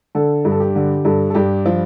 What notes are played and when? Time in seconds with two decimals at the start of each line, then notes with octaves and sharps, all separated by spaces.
0.15 D3 A4
0.45 G2
0.52 A4
0.60 G4
0.76 D3
1.05 G2 A4
1.30 A4
1.35 G2 G4
1.65 F3 F4